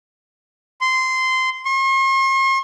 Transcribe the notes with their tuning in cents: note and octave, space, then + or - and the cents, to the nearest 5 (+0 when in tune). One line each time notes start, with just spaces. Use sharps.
C6 -15
C6 +45